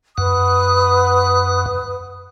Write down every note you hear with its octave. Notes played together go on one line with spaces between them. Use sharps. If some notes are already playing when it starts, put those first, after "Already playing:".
F#2 B4 F#5 D#6